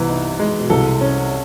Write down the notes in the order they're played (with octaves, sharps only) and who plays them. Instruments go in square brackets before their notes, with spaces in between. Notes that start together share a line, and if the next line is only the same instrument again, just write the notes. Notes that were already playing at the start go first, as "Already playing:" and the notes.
Already playing: [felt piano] C2 C3 [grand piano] E3 B3
[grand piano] D#4
G#3
[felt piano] B2
[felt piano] C2 C3 [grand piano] A4
[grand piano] C#4